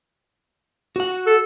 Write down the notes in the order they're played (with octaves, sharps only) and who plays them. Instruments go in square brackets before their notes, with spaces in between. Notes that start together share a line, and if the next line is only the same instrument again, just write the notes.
[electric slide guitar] F#4 F#5
[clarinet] A4